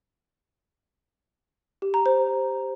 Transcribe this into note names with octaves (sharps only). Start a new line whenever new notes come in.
G4
A#5
C5